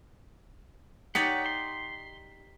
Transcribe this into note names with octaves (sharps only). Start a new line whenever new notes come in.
D#4 G4 C#5 D5 F#5 B6
C6